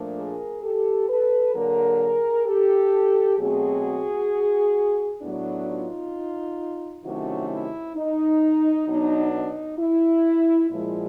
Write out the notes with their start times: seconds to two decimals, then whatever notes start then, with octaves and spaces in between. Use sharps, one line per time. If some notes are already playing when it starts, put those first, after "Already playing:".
Already playing: A#2 F3 A3 D4
0.17 G#4 A#4
0.63 G4 A4
1.09 A4 B4
1.55 D3 F#3 A#3 G#4 A#4
2.46 G4 A4
3.38 B2 F#3 A3 C4 F#4 G#4
5.21 A2 F#3 B3 D4 E4
5.67 D#4 F4
7.04 C3 D#3 F#3 A3 C#4 E4 F#4
7.50 E4
7.96 D#4
8.87 B2 F#3 B3 D4 D#4
9.33 D#4
9.79 E4
10.70 A#2 F3 G#3 E4